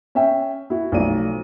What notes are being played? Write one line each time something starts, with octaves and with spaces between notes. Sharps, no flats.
C#4 E5 G5
E4 F#4
B1 F3 A3 D5 D#7